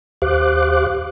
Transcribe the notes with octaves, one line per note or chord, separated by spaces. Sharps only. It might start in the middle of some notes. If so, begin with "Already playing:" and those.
D#2 G4 C5 F5 D6 F#6